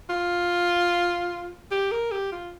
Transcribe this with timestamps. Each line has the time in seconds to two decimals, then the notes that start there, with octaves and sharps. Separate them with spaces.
0.10 F4
1.71 G4
1.91 A#4
2.11 G4
2.32 F4